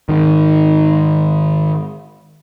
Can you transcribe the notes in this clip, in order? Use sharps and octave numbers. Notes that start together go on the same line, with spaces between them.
G#2 D#3